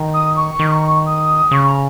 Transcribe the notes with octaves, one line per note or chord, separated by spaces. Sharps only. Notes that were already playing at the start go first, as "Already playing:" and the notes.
Already playing: D#3
D#6
C#6
D#3
D#6
C#3 C#6
A#5